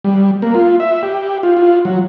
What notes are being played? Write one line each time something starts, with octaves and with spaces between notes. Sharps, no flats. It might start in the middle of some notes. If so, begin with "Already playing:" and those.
G3
A#3
F4
E5
G4
F4
F4
F#3